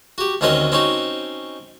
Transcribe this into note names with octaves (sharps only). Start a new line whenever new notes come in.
F#4 G4
D2 D#3 C4 C#4 F#4 D#5
C4 C#4 D#4 F#4